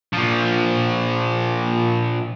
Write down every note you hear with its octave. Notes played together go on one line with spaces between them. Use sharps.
A#2 F3